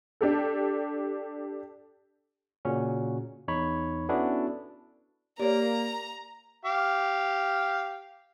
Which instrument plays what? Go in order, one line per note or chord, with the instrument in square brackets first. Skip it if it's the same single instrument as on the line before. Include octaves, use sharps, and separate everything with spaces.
[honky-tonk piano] D4 G4 A4
[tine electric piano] A#2 C#3 C#4 F#4
E2 D#4 C#5 B5
B3 C#4 D4 E4 F#4 A4
[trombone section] A#3 [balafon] G4 C#5 [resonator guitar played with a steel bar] D5 [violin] A#5
[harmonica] G4 F5